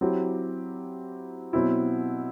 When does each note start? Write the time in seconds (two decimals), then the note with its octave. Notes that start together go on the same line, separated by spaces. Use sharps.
0.01 F#3 C4 E4 G4
1.53 B2 F#3 C4 E4